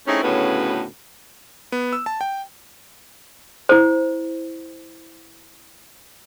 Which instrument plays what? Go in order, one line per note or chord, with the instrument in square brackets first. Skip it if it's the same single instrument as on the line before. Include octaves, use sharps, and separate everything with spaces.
[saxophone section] A3 C4 C#4 D#4 E4 G#4
D2 A2 C#3 B3 C#4 B4
[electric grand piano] B3
E6
A5
G5
[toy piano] E4 C5